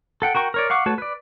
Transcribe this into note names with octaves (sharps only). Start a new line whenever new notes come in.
A4 F#5 G5
F#4 A#4 G5 C#6
A#4 C#5 D5
F5 F#5 C#6 D6
A3 F#4 B4 C#5 A5
B4 D5